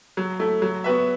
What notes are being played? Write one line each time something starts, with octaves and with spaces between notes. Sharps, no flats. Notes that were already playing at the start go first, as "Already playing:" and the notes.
F#3
A3 E4
F#3
B3 F#4 B4 E5